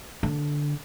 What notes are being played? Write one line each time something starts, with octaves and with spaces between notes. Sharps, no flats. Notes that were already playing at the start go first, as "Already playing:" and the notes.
D3